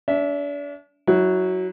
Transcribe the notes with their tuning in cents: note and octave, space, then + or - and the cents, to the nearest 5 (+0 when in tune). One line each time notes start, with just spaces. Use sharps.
D4 -35 E5 +0
F#3 +0 E4 -30